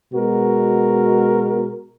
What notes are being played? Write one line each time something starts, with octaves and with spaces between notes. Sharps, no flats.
B2 G#3 F#4 A#4